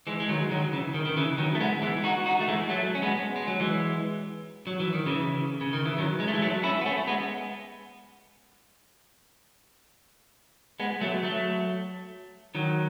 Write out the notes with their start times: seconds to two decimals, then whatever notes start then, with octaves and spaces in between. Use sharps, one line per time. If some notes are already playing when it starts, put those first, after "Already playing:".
0.07 E3 G#3
0.20 G#3
0.29 D#3 F#3
0.51 D#3 F#3
0.73 C#3 E3
0.94 D#3
1.06 D#3
1.17 C#3 E3
1.38 D#3 F#3
1.55 A3
1.60 G#3 B3
1.82 E3 G#3
2.04 D#4 F#4
2.26 D#4 F#4
2.40 A3
2.48 E3 G#3
2.69 F#3 A3
2.95 C#4
3.02 G#3 B3
3.36 G#3
3.48 F#3
3.60 E3 G#3
4.67 F#3
4.80 E3
4.94 D#3
5.06 C#3 E3
5.61 C#3
5.73 D#3
5.86 E3
5.98 D#3 F#3
6.20 G#3
6.28 A3
6.34 E3 G#3
6.42 F#3 A3
6.63 C#4 E4
6.81 B3
6.86 A3 C#4
7.07 G#3 B3
10.80 G#3 B3
11.01 F#3 A3
11.23 F#3 A3
12.55 D#3 F#3